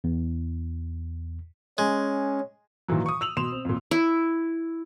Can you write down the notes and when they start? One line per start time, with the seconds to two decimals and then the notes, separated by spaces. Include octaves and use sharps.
0.04 E2
1.78 G#3 C#4
2.88 A#2 D#3 E3 F#3
3.06 C#6 D#6
3.21 E6 F7 F#7
3.37 B2 C6 E7 F7
3.52 C4
3.65 F2 A#2
3.91 E4